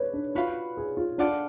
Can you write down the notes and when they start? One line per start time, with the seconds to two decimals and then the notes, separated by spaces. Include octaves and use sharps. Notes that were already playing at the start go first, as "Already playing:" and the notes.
Already playing: B4 C#5 D5
0.14 D4
0.35 F4 F#4 B4 F5 B5
0.77 G#4
0.97 F4
1.18 D4 F4 A4 D5 F#5